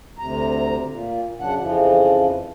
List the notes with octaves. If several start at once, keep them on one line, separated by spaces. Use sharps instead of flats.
D2 C3 A#5
A#2
F#2 C#3 F#3 D4 F#5
F2 C#3 E3 F3